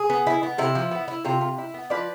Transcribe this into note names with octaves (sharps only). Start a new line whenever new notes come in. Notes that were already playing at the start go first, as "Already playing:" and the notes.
Already playing: G#4
B3
E4
B3
C3 E4
F3
B3
E4
C3 F4
C3
E4
B3
F3 B4 D5